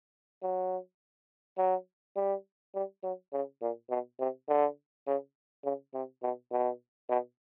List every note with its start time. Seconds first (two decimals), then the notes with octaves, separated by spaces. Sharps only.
0.42 F#3
1.58 F#3
2.16 G3
2.75 G3
3.03 F#3
3.33 C#3
3.61 A#2
3.90 B2
4.19 C3
4.48 D3
5.07 C#3
5.65 C#3
5.94 C3
6.23 B2
6.52 B2
7.09 B2